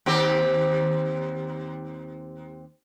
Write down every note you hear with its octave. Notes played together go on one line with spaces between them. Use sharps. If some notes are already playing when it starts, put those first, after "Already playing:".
D#2 C4 G4